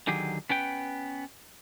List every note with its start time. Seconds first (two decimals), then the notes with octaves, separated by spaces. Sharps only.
0.07 D3 D#3 F#3 G4 G#4
0.50 B3 C#4 B4 G5